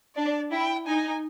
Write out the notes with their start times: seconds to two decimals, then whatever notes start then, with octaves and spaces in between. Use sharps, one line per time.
0.16 D4 D5
0.51 E4 G5
0.86 D#4 G#5